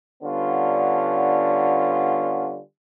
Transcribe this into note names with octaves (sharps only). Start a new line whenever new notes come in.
D3 G3 B3 C#4 D4 F4